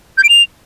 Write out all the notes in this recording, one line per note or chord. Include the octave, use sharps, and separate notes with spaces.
G6
D7
F7